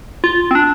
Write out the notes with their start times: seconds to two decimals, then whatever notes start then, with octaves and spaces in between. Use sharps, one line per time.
0.24 F4
0.51 C4
0.55 D4